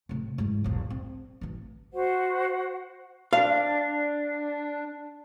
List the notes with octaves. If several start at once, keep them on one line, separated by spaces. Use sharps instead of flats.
A2 C3
G#2 E3
E1 A#1
C4
A1 E3
F#4 C5 F#5
D4 F5